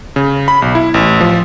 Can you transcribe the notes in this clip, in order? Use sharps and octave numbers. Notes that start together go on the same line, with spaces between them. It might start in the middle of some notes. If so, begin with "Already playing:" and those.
C#3
B5
B1
E4
A1
F3